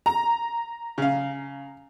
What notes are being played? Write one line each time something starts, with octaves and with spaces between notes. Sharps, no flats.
A#5
C#3 F5